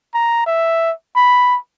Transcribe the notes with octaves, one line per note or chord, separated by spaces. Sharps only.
A#5
E5
B5